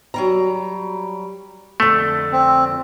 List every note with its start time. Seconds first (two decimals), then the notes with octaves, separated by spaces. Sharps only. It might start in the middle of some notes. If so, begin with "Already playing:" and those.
0.14 F#3 G3 A#5
1.80 F2 D3 A3
2.33 C4